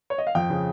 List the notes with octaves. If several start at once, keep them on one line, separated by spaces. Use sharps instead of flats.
C#5
D#5
F5
F2 G5
C#3